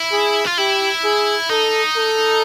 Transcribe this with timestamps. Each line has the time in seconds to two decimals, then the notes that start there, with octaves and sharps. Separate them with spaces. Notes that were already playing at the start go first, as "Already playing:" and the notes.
Already playing: E4
0.12 G#4
0.46 F4
0.58 E4 G4
1.04 G#4
1.49 D#4 A4
1.96 A4